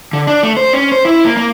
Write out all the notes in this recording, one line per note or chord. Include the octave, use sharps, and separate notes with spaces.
D3
D4
A3
C5
C#4
C5
E4
A#3
A#3